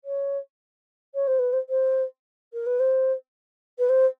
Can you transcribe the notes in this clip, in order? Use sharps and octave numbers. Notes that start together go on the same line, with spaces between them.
C#5
C#5
C5
B4
C5
C5
A#4
B4
C5
B4
C5